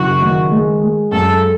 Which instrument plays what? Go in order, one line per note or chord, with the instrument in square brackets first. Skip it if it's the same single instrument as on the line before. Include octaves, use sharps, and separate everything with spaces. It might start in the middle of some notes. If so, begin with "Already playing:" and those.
Already playing: [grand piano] F#1 F#2 [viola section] F#4
[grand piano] D#3
G#3
G#3
[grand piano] F#2 [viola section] A4